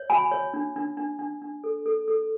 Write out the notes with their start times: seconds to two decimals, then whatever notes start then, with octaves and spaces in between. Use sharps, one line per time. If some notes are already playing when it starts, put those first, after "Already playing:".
Already playing: C#5
0.10 F#4 G#5 B5
0.32 C#5
0.54 D4
0.76 D4
0.97 D4
1.19 D4
1.42 D4
1.64 A4
1.86 A4
2.08 A4